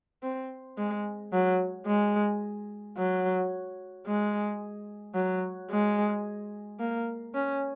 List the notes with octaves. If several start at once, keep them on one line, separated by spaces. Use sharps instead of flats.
C4
G#3
F#3
G#3
F#3
G#3
F#3
G#3
A#3
C#4